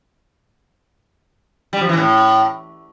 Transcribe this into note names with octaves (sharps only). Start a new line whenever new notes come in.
G3
F3
E3
A2